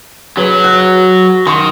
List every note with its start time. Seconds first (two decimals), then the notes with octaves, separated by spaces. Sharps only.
0.37 F#3 G#4 B4
0.64 F#6
1.47 D#3 C6 C#6